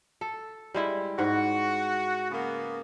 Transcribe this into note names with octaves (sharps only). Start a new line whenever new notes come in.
A4
G3 G#3 E4
G#2 F#4
C#3 A#3 B3